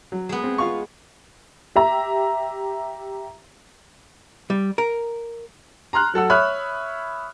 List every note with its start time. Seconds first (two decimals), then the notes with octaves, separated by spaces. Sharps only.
0.12 F#3
0.29 G#3 B3
0.44 C4
0.58 F4 F5 C#6
1.76 G4 E5 A#5
4.50 G3
4.78 A#4
5.93 A#5 C6 F6 F#6
6.14 F#3 A4 F#5 E6
6.30 C#5 E5 B5 D#6 F6 F#6